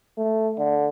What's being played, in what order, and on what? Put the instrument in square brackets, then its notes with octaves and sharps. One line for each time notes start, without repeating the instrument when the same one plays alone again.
[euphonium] A3
D3